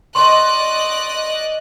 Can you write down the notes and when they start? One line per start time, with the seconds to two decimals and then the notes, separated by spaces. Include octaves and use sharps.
0.15 D5 D#5 C6 C#6 F#6